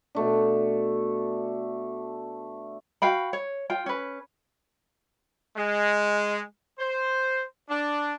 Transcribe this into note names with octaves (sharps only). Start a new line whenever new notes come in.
B2 A3 D4
F#4 F5 G5 B5
C#5
F4 G5
C#4 B4
G#3
C5
D4